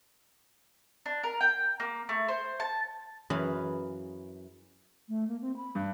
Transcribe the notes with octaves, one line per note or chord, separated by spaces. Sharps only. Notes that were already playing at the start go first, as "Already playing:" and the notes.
D4
A#4
G5
A#3
A3
C5
A5
F#2 E3 G#4 B4 F5
A3
A#3
C4
B5
G2